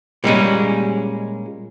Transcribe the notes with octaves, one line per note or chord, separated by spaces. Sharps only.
A#2 G3 G#3 C#4